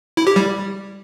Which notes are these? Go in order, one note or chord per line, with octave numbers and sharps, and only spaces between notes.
E4
G4
G3